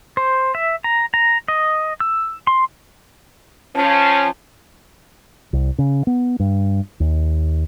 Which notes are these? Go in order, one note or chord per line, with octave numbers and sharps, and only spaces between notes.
C5
E5
A#5
A#5
D#5
E6
C6
F3 C#4 A5
C2
C#3
B3
G2
D#2